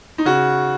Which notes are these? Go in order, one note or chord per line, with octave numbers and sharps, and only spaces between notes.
D#4
C#3 F#4